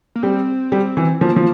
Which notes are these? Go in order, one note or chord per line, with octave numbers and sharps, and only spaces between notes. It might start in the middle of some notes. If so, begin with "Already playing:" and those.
A#3
G3 C4
G3
E3
F3 A#3
F3